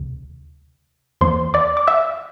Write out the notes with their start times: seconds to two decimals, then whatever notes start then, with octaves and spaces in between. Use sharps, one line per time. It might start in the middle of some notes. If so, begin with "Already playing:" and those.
Already playing: D2 C3
1.21 E2 E3 A#3 C5 C6
1.54 D5 D6
1.77 D6
1.87 E5 E6